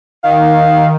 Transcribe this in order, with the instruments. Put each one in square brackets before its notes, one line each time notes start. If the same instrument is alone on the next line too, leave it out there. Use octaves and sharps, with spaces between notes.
[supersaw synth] D#3 [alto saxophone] F5